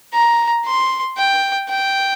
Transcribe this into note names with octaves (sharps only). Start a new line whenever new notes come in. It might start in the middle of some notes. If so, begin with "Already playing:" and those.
A#5
C6
G5
G5